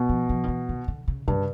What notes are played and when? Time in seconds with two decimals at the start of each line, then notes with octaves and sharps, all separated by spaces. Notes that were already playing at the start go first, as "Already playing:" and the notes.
Already playing: B2
0.09 F3
0.29 F3
0.44 D#3
0.48 E3
0.69 D#3
0.88 D3
1.08 C#3
1.28 G2 C#3